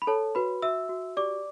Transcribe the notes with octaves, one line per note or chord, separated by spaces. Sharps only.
B5
A4 C#5 A5
F#4 B4 B5
F#4 E5 E6
F#4
G4 D5 D6